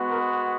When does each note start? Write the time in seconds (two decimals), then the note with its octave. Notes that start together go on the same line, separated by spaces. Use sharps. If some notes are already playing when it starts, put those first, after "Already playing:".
Already playing: G#3 B3 F#4
0.09 A#4